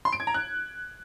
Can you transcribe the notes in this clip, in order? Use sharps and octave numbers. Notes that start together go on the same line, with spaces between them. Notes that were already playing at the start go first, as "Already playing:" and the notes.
C6
D7
G#6
A#5
F#6